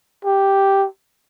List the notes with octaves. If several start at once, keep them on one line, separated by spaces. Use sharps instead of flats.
G4